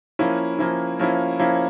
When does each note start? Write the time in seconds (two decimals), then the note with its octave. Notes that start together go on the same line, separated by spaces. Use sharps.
0.19 F3 A#3 C#4 E4
0.59 F3 A#3 C#4 E4
0.99 F3 A#3 C#4 E4
1.39 F3 A#3 C#4 E4